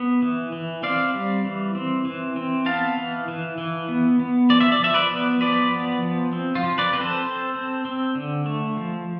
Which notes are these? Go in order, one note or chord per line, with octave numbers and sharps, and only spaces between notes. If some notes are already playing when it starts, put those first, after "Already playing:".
Already playing: B3
E3
E3
C4 D5 F5
G3
E3
C4
E3
C4
B3 F5 A5
E3
E3
E3
B3
B3
F3 D5
E5
D5
F3 E5
B4 D5
B3
F3 B4 D5
B3
F3
C4
F4
F3
B4 D5
C4 B4
A4 C5
C4
C4
C4
D3
A3
F3